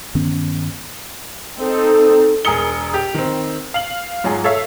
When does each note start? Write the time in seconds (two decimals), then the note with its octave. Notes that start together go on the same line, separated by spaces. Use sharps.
0.15 G2 D#3 B3 C#4
1.58 C4 D#4 A4
2.45 E1 G#4 A#4 D#6 C#7 G7
2.94 G4
3.14 D#3 C4
3.74 F5 F#7
4.24 G#2 F#3 F4 G#4
4.44 A4 C#5 E5 F5